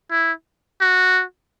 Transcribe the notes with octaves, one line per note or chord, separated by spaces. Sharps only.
E4
F#4